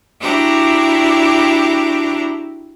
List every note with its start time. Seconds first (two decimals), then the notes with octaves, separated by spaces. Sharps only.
0.19 D4 E4 F#4 G4 A#5